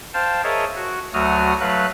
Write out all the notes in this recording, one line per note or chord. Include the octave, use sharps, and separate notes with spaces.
C5 F5 G5 A5
G#4 A#4 C#5 D#5 E5 A5
F#4
D2 F#3 A3 F#4 D#6 F6
F#3 A3 B4 F5 F#6